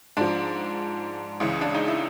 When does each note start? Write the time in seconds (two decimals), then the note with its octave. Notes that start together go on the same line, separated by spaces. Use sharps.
0.17 G#2 F3 D4
1.40 C#2 C#3 E3
1.61 D4
1.75 D#4
1.88 E4